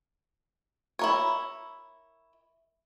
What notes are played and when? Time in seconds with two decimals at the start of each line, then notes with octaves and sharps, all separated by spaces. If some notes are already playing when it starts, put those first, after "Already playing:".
0.99 E4 A#4 C#5